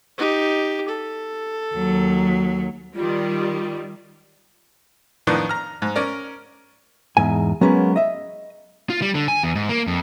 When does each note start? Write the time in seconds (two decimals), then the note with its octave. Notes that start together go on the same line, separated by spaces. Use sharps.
0.18 D#4 G4
0.88 A4
1.75 D#2 F#3
2.95 D#3 G3 F4
5.27 F2 A2 D#3 B3 D4
5.49 A#5 F6
5.82 G#2
5.96 C#4 A#4 D5
7.17 E2 G#2 G#5
7.61 F#3 G#3 A#3 B3 C#4
7.96 D#5 E5
8.90 F4
9.02 G3
9.15 D3
9.28 G#5
9.43 E2
9.55 G#2
9.69 A#3
9.87 F2